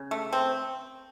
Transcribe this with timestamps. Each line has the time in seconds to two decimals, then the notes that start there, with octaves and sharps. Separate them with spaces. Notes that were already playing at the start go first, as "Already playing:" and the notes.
Already playing: C#3
0.11 A3
0.33 C4